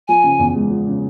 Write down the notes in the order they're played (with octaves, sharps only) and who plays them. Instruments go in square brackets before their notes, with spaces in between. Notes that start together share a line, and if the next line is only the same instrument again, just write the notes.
[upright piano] F3 [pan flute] G#5
[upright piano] C#3
E2
G#3
F3
C#3